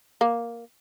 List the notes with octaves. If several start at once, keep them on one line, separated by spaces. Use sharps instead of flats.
A#3